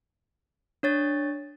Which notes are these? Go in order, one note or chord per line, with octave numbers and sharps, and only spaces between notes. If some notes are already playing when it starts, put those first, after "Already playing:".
D4 C#5 A6